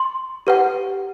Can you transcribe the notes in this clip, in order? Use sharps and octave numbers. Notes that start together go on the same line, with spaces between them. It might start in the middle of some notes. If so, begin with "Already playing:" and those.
Already playing: C6
G4 B4 F#5